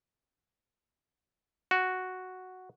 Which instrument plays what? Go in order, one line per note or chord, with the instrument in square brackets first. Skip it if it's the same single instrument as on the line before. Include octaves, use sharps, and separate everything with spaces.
[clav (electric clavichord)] F#4